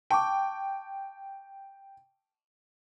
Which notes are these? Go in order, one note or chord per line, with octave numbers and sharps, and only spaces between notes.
G5 A5 C#6 D6